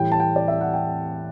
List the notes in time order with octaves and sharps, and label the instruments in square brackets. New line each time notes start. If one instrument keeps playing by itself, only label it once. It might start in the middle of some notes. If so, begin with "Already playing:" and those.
Already playing: [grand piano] A2 E3 G3 G5
A5
G5
D5
E5
F#5
G5